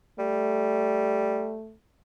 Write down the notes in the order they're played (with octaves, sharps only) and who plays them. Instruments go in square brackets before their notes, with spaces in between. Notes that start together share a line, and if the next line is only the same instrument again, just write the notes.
[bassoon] G3 [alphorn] A3